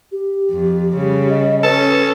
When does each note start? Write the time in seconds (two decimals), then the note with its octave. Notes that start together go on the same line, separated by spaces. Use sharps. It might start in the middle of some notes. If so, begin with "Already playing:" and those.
0.12 G4
0.52 F2
0.96 C#3 G3
1.30 D#5
1.63 C#4 A4 B4